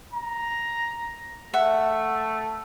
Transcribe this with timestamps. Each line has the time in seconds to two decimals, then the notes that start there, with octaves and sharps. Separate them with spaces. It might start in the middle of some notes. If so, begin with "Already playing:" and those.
0.14 A#5
1.54 A3 E5 F#5